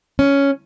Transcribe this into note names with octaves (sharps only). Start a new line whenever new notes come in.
C#4